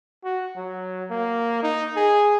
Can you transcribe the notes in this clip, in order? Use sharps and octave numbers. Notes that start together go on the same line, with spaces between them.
F#4
F#3
A#3
D#4
G#4